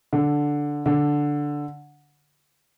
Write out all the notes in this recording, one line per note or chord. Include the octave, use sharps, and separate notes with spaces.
D3
D3